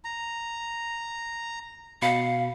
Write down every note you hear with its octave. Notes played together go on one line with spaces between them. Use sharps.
A#5
B2 F5 B5 C#7